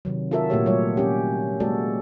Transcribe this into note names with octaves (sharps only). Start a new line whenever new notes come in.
C3 D#3 F#3
F4 F#4 A4 A#4 E5
A#2 A3 A#3 F#4 G4 C#5
F#3 G3 A3 F4 C#5
C#4 G4
G#3 A#3 F#4 A4 D5